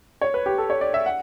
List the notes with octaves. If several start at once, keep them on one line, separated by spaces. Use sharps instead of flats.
C#5
B4
G4
A4
C#5
D5
E5
F#5